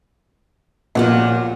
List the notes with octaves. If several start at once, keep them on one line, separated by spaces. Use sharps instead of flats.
A#1 A#2 B3 F4 F#4 C#5